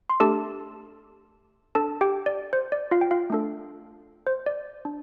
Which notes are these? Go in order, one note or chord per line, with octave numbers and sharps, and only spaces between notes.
C6
A3 D4 G4 A4 A5
D4 A4 A5
G4 G5
D5
C5
D5
F4 F5
G5
F4 F5
A3 D4 A4
C5
D5
D4